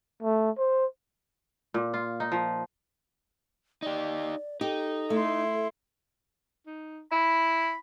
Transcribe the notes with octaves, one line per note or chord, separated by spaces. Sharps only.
A3
C5
A#2
F4
D#4
F3
D#4 G4 D5
D#4 G4 A4
A3 E4 C6
D#4
E4 B5